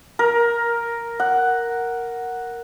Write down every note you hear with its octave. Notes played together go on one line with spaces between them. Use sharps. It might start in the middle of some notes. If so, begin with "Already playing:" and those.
A#4
F#5